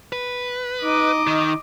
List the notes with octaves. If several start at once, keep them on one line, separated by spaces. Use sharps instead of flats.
B4
D#4 D#5 D6
D#3